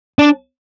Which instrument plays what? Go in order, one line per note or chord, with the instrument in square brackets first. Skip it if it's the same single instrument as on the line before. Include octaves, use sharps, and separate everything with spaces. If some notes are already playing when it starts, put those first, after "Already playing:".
[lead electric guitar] D4